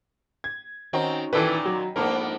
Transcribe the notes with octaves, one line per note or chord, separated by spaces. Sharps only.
G#6
D#3 C4 C#4 D#4 F#4
A#2 D#3 E3 A4 B4 G5 B5
F#3
F2 G#2 A#3 B3 D4 A#4